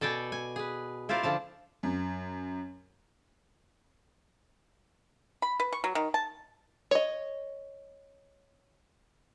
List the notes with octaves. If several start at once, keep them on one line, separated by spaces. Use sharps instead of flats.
B2 A4 D5 G5 G#5
G#5
G#4 B4
E4 F4 A#4 C5 D5
D3 F3 A5
F#2
B5
B4
C#6
F#3
D#3
A5
C#5 D#5